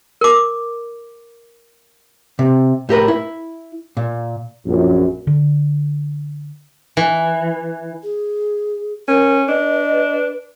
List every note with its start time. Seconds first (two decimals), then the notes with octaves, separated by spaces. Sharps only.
0.21 A#4 D6
2.39 C3
2.89 A2 G4 A#4 B4
3.08 E4
3.97 A#2
4.66 A#1 F#2
5.27 D3
6.97 E3
8.03 G#4
9.08 C#4 A#4
9.48 D4 B4 D#5